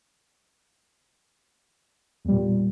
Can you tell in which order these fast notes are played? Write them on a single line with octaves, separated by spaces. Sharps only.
E2 G3 A#2